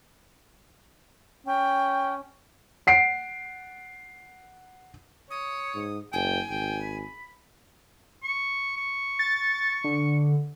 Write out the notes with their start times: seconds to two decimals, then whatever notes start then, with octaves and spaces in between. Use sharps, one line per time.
1.46 C#4 G5
2.87 F#5 C7 D7
5.30 C#5 D#6
5.75 G#2
6.13 F#1 G5 G#5
6.50 G#1 G5
6.82 B5
8.23 C#6
8.77 C#6
9.19 A6
9.84 D3